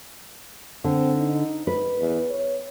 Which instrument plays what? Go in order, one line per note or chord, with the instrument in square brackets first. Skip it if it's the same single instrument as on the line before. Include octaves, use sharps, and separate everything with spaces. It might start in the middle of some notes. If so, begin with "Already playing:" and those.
[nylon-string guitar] D3 [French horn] C4
[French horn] D#4
[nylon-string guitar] B4
[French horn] E2
C#5